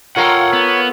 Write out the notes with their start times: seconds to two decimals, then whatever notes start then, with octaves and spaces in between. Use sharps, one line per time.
0.16 F4 A4 A#4 C#5 F#5 G5
0.53 B3